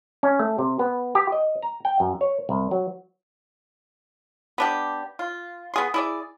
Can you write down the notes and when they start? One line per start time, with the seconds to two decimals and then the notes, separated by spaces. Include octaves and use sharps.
0.23 C#4
0.39 A3
0.59 C3
0.79 B3
1.15 G4
1.32 D#5
1.62 A#5
1.85 G5
2.00 F#2
2.21 C#5
2.49 C2
2.71 F#3
4.58 B3 D4 G4
5.19 F4
5.74 B3 G#4 C6
5.94 E4 G#4 D5